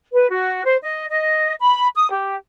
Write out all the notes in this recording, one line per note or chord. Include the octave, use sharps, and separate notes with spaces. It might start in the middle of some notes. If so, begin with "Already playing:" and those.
B4
F#4
C5
D#5
D#5
B5
D#6
G4